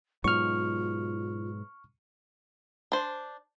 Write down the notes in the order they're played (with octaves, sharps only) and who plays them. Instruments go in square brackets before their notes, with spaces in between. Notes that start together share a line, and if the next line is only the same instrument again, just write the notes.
[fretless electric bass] G#2 B2 F#3 [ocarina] F4 [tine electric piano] C#6 F6
[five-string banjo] D4 C5